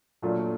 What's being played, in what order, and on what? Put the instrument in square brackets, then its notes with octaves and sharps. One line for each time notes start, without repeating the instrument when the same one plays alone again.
[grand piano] A#2 F#3 A3 D4 F4